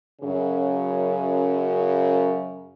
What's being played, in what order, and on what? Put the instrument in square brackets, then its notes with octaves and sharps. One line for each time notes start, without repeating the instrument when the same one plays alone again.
[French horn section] F#2 C#3